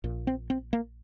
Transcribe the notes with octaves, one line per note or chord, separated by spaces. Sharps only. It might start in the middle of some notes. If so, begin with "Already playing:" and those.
A#1 A#2
C4
C4
A#3